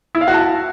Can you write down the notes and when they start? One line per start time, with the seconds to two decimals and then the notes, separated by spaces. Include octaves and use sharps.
0.15 E4
0.21 F5
0.28 F#4
0.34 A5